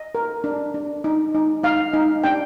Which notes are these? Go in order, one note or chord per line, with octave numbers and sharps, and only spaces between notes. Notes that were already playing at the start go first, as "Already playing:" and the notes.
Already playing: D#5
A#4
D4
D4
D#4
D#4
D#4 F5
D#4
D4 G5